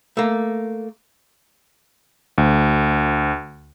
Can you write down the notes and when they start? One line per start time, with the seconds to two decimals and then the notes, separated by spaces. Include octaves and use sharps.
0.17 A3 A#3
2.38 D2